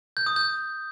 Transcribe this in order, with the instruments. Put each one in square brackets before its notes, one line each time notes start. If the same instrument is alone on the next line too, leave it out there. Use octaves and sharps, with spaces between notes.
[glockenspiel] G6
D#6
G6